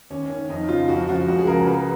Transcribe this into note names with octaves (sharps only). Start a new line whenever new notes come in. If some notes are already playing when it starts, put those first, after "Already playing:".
D#2 C#4
D#3 C#4
F2 D#4
C#3 F3 F4
F2 F#4
C#3 F3 F#4
C#2 F#4
G#4
C#3 F3 A#4
C#2 B4